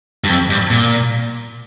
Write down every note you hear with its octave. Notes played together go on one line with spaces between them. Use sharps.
G2
F2
G2
A#2